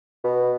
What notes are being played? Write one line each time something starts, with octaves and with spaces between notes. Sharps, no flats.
B2